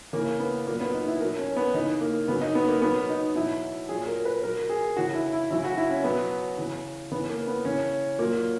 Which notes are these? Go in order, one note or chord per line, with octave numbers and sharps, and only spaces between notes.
C#3 E3 A#3
B3
A#2 F#3 A#3
B3
D#4
E4
B2 F#3 A#4
C#4
B3
C#3 E3 D#4
A#3
C#3 F#3 B3
D#4
B3
A#3
B2 F#3 B3
D#4
B2 F#3 E4
A#2 F#3 G#4
A#4
B4
B2 F#3 A#4
G#4
C#3 E3 F#4
E4
E4
C#3 F#3 E4
F#4
E4
C#4
B2 F#3 B3
C#3 E3
C#3 E3 B3
A#3
B3
C#3 E3 C#4
A#2 F#3 A#3